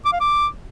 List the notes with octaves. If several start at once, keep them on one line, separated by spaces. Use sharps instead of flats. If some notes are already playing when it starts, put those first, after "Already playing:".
D6
F5
D6